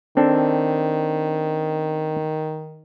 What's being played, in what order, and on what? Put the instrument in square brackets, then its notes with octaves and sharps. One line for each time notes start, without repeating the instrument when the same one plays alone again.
[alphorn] D#3 [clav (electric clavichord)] C4 D4 A4